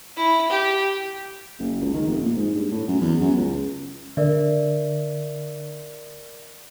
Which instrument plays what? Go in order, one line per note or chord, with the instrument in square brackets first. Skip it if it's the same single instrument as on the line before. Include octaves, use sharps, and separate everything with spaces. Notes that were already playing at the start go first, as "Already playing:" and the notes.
[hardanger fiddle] E4
G4
[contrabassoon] F#1
C#2
D#3
F1
A#2
G#2
G2
A2
F#2
E2
F#2
C#2
[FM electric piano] D3 [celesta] A#4 D5 E5